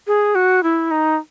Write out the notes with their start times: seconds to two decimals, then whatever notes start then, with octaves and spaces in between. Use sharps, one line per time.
0.07 G#4
0.35 F#4
0.63 E4
0.91 D#4